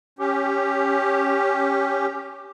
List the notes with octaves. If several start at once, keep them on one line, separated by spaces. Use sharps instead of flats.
C#4 G4